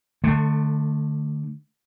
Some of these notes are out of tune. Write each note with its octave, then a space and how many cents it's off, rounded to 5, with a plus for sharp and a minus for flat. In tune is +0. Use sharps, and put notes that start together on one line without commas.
D3 +25 A3 +0